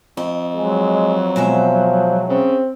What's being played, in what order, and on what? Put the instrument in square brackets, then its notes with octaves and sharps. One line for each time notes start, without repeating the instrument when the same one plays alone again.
[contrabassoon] F2 [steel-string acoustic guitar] D#5
[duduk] F#3 [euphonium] G#3
[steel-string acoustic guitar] B2 G#3 E5 [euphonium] F3
[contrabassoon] C#3 [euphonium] C4